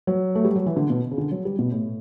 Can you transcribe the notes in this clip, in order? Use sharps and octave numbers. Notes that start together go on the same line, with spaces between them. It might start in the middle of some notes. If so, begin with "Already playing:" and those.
F#3
A3
G3
F#3
E3
D3
B2
C#3
D3
F#3
G3
B2
A2